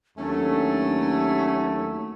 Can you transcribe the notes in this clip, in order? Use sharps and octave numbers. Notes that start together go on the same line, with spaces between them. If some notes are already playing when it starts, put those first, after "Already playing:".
D#2 F#3 A3 C#4 D4